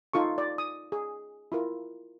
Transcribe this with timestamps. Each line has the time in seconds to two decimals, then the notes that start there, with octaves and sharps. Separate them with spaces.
0.13 D#4 F4 A4 C#6
0.38 D5
0.58 D#6
0.92 G#4
1.52 E4 F4 A#4